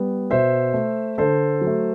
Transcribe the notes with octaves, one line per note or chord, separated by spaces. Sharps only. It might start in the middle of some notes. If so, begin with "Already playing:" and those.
Already playing: G3 B3
B2 C5 E5
A3
D3 A4 C5
F#3
A3